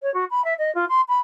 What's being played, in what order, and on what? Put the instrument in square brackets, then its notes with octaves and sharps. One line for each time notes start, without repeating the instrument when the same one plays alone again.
[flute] C#5
F#4
B5
E5
D#5
F4
C6
B5